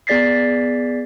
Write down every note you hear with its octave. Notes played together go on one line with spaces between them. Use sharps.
B3 G#4 D5 A6 B6 C7